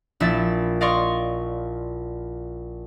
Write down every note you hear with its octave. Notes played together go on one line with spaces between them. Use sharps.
A#1 E4 E5 A6
D5 D#5 F5 C6 C#6